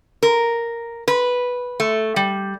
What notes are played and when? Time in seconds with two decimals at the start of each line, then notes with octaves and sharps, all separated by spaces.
0.23 A#4
1.08 B4
1.80 A3
2.16 G3